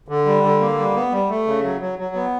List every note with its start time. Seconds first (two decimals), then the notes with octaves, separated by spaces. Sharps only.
0.08 D3
0.25 G3
0.43 D3
0.60 A#3
0.78 G3
0.95 B3
1.12 G3
1.29 A3
1.47 C#3
1.64 F#3
1.81 F#3
1.99 F#3
2.15 B3